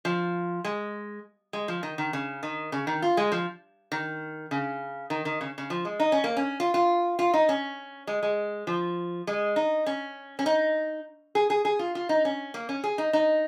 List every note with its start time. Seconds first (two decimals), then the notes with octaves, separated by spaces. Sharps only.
0.05 F3
0.64 G#3
1.53 G#3
1.68 F3
1.83 D#3
1.98 D#3
2.13 C#3
2.43 D#3
2.72 C#3
2.87 D#3
3.02 F4
3.17 G#3
3.32 F3
3.92 D#3
4.51 C#3
5.10 D#3
5.25 D#3
5.41 C#3
5.58 C#3
5.70 F3
5.85 G#3
6.00 D#4
6.12 C#4
6.24 A#3
6.37 C#4
6.60 F4
6.74 F4
7.19 F4
7.34 D#4
7.49 C#4
8.07 G#3
8.23 G#3
8.67 F3
9.27 G#3
9.56 D#4
9.86 C#4
10.39 C#4
10.46 D#4
11.35 G#4
11.50 G#4
11.65 G#4
11.79 F4
11.95 F4
12.09 D#4
12.25 C#4
12.54 A#3
12.69 C#4
12.84 G#4
12.98 D#4
13.13 D#4